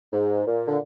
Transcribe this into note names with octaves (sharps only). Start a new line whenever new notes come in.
G#2
A#2
D3